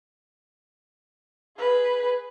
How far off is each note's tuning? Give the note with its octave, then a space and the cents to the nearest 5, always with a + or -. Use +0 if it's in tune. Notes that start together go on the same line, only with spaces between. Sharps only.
G#4 +0 B4 +0